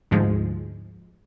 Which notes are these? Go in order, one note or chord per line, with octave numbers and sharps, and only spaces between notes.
D2 G#2 F3 G#3